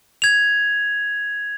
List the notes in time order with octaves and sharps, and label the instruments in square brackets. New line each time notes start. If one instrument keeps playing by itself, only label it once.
[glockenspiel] G#6 F7